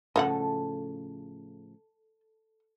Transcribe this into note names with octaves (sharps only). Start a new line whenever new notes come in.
A2 C#3 F3 A4 D#5 F5 F#5